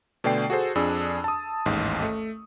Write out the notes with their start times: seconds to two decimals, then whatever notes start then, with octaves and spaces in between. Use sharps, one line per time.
0.24 B2 D3 A3 D5 G5 C7
0.50 F#4 G#4 A4 C5
0.75 F2 D4 G#4 E6
1.24 A5 D#6
1.66 A1 D#2 G#2
2.03 A3